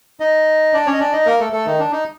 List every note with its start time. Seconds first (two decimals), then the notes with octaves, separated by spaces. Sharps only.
0.20 D#4 D#5
0.73 D4 D5
0.86 C#4 C#5
0.93 D#5
0.99 D4 D5
1.12 D#4 D#5
1.26 A#3 A#4
1.40 A3 A4
1.53 A3 A4
1.66 D#3 D#4
1.79 D4
1.92 D#4